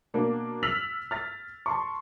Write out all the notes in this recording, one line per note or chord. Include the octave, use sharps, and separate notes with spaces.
B2 A#3 D4 A#4
E6 F6 A6 B6 F7 F#7
F6 A6 B6
A5 C6 C#6